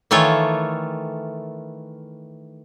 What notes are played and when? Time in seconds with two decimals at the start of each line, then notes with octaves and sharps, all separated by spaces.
0.11 D#3 E3 A3 F4 C#5